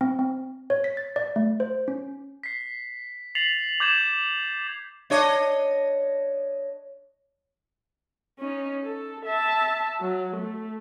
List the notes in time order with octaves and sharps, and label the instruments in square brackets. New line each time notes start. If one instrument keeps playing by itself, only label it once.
[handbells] C4
C4
C#5
B6
A6
D5
A3
C5
C#4
[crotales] B6 C7
A6 B6 C7 F7 F#7
D6 G6 G#6 E7
[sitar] D4 C#5 D#5
[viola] C#4 D#4
A4
E5 A5
F#3
A3